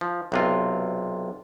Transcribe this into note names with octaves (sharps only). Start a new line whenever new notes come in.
F3
B1 C3 F4